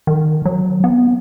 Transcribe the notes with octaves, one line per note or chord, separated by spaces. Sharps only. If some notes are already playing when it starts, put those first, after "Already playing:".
D#3
F#3
B3